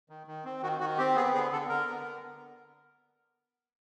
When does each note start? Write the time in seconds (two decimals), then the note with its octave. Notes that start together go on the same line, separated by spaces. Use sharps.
0.09 D#3
0.27 D#3
0.44 C4
0.62 D#3 F#4
0.80 D#3 F#4
0.98 C4 G4
1.16 B3 G#4
1.34 D3 G#4
1.52 D3 A4
1.69 D3 A#4
1.87 B3